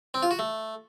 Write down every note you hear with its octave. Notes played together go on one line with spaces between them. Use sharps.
C4
F4
F#4
A3